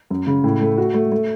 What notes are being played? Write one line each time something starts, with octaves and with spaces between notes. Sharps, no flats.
F#2
C#3
A2
A3
F#4
A3
A3